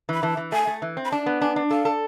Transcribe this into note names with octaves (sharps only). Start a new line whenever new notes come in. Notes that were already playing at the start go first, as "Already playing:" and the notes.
E3 B5
E3 A5
E3
A3 G#5
A3
E3
C4
B5
D4 A5
B3
D4 G#5
D4
A4 F5
A4